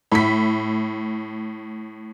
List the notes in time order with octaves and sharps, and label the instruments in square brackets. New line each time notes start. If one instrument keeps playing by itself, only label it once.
[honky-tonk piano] A2 B6